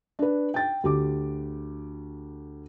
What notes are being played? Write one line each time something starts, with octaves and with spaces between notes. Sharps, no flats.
D4 B4
G5 A6
D2 G4 D6